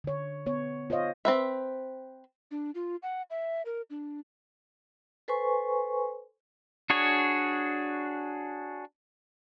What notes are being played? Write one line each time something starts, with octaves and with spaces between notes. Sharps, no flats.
D3 C#5
B3 C#5
F4 C5 C#5 D#5 F5
C4 B4 E5
D4
F4
F#5
E5
A#4
D4
A4 B4 C5 G#5 C6 C#6
D4 F#4 G#4 C#5